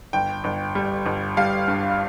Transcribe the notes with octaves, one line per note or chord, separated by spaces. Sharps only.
G1 G5
G1
G3
G1
G3 F5
G2